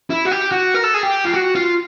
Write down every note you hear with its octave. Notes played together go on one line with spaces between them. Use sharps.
E4
F#4
G4
F#4
A#4
A4
G#4
G4
F4
F#4
F4